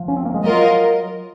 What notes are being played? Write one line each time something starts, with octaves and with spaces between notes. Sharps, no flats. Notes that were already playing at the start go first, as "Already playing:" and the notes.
Already playing: F3
C#4
C4
A#3
G#3
F#3 F4 A#4 D#5